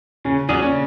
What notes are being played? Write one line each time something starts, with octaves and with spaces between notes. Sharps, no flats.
C#3 C#4
F#3 C#4 D4 G#4
C#4
C#3